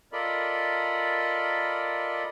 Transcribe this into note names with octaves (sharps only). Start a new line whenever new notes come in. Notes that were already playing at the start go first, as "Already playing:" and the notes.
F4 A4 A#4 D5 D#5 B5